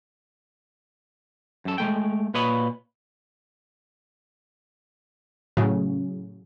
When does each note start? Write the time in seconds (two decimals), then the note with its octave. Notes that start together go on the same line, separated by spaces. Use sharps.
1.65 F#2 A4
1.78 G#3 A3 G5
2.34 A#2 B4 C#5 D#5 B5
5.57 A2 C#3 F#3